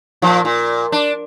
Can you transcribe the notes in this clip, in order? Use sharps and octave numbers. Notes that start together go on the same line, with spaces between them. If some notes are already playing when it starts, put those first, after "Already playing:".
A#2 F3
A#2
D4